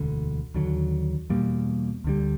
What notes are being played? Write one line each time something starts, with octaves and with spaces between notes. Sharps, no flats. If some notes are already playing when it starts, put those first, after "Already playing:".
Already playing: E1 D2 D3
D#2 D3 F#3
E2 B2 G3 A#3
D2 D3 G3